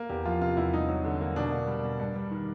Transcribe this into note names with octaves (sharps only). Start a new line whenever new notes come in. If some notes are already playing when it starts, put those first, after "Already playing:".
Already playing: A#3
E2 G4
F3 F4
C3 F4
E2 E4
G2 D#4
F#3
D3
A#3
B2 D4
A#3
G3
B2
G2
G3
D#3